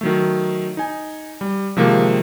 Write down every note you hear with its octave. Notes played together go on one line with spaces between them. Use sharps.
D#3 F#3 A3
D#4 G#5
G3
C3 D#3 F3 G#3 A#3